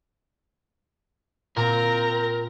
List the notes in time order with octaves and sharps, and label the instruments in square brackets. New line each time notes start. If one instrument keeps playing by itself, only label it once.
[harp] A#2 [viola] C4 A#5 [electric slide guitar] A#4